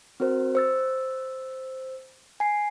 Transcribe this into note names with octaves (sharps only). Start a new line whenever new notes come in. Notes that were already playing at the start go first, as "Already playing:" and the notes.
C4 F#4 A#4 C5
C5 E6 A6
G#5 C7